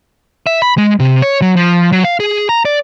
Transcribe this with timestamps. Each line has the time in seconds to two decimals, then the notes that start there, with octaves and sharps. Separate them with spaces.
0.47 E5
0.62 B5
0.78 G#3
1.00 C3
1.22 C#5
1.42 F#3
1.56 F3
1.92 F#3
2.05 F5
2.20 G#4
2.49 A#5
2.65 D5